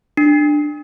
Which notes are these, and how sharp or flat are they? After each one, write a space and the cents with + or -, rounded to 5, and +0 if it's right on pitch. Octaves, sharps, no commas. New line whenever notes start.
D4 +15